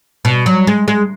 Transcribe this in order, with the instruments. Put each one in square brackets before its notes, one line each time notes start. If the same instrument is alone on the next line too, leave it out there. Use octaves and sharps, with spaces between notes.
[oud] B2
F#3
G#3
G#3